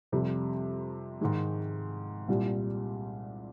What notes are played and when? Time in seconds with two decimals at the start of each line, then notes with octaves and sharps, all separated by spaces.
0.12 F2 C3 G3
1.21 G#2 D#3 G#3
2.28 C2 A#2 G3